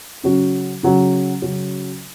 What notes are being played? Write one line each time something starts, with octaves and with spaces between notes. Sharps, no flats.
C#3 F#3 C#4 F#4
C#3 F#3 C#4 F#4
C#3 F#3 C#4 F#4